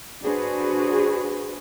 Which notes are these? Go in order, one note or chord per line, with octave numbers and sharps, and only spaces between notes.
D4 F#4 G#4 B4 C5